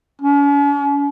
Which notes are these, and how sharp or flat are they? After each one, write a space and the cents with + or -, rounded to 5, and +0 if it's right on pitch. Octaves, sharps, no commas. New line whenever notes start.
C#4 +45